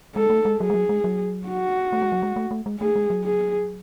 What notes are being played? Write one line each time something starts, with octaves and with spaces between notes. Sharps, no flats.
G#3 A4
A3
G#3
F#3 G#4
G#3
F#3
G#3
F#3
F#4
A3
G#3
F#3
G#3
A3
A3
G#3
A3 G#4
G#3
F#3
G#4